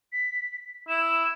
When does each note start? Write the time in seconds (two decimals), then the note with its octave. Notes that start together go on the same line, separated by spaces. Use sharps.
0.13 B6
0.89 E4 E7